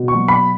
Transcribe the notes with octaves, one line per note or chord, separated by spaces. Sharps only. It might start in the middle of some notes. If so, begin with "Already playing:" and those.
Already playing: B2
C#6
F#3
B5